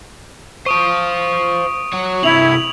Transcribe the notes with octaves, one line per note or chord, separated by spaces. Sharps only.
C5 F5 C#6 D#6 D7
F#4 C#5
C3 E3 E4 G#6 F7 F#7